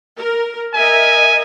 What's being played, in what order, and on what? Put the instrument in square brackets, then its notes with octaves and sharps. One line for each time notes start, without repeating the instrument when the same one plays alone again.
[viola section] A#4
[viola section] A#4 D#5 E5 [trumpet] G#5